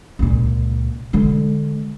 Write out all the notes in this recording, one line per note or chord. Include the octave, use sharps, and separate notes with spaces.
C#2 A#2
D3 G#3